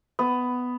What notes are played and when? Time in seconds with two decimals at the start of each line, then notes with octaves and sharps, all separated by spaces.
0.19 B3